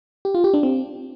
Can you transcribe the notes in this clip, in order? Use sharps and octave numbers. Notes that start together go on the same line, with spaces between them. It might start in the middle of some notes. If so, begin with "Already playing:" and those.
G4
F4
G4
D4
C4